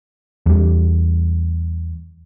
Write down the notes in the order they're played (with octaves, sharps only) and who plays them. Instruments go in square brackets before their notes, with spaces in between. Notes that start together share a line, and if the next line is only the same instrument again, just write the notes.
[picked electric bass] E2 G3